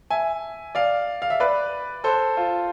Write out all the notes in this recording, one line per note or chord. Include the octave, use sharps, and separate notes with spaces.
E5 G#5
D5 F5
F5
E5
B4 D5
A4 C5
F4